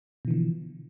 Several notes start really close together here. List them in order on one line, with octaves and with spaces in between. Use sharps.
B2 E3 D3 F3